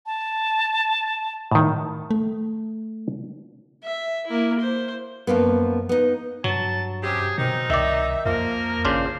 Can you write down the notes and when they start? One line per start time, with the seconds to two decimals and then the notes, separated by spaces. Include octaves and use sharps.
0.06 A5
1.51 A2 D#3
2.11 A3
3.84 E5
4.27 A#3 E4
4.60 C5
5.27 F#2 F3 A#3 B3
5.89 B3 D#4
6.44 G2 F#3 A5
7.03 C3 C#4 G4 G#4
7.38 B2 D#3 C4 D#4
7.70 C2 D#3 D5 E5
8.26 F2 F3 A#3 A#4
8.85 G#1 C#3 D4 F4 C5